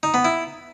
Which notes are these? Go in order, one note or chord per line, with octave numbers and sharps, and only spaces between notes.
D#4
B3
E4